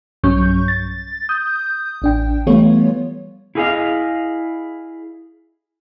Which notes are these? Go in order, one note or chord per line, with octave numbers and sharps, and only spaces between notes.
B1 G2 F#3 C#4 C#6 G6
A6
D#6 G6
A1 D4 G5
E3 G3 A3 B3 F4 C#5
E4 F4 G#4 A#4 D#5 F5